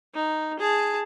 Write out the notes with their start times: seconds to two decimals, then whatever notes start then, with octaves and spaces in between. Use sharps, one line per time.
0.15 D#4
0.59 G#4 A5